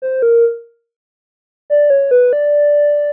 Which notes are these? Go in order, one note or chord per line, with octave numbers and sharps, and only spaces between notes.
C5
A#4
D5
C#5
B4
D5